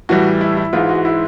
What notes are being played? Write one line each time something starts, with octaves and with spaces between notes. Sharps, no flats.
A2 E3 G3 F#4
E4
E4
G#2 E3 G#3 F4
F#4
E4